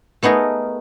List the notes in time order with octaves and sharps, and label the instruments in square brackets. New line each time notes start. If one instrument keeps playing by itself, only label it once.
[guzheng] A3 B3 D#4 G#4 A#4